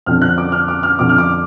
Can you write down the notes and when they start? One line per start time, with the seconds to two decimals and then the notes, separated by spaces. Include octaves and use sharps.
0.06 F2 D3 F6
0.22 F#6
0.38 D6
0.52 F6
0.68 D6
0.83 F6
0.99 F2 D3 D6
1.09 F6
1.18 D6